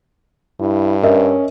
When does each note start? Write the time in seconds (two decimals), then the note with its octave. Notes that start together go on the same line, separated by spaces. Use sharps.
0.60 G2 E4
1.03 C#4 A#4 D#5 E5